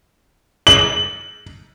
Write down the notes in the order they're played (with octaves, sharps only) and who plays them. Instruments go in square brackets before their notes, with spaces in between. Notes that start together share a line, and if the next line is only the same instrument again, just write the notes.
[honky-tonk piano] F#7